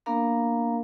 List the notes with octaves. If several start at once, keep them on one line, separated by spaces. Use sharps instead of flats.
A#3 B3 D4 A#4 F5 A#5